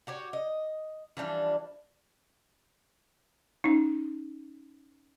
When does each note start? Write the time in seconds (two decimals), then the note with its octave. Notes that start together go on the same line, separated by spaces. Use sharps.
0.07 F#4 G4 C#5
0.33 D#5
1.17 E3 F3 G3 D4
3.64 C#4 D#4